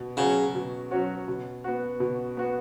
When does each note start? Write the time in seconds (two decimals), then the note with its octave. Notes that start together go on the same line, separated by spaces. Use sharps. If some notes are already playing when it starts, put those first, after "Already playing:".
Already playing: B2
0.17 C#3 F#3 C#4 F#4
0.55 B2
0.91 F#3 C#4 F#4
1.28 B2
1.64 B3 F#4
2.00 B2
2.37 B3 F#4